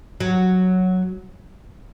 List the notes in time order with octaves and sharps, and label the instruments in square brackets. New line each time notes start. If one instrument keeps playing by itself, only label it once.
[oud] F#3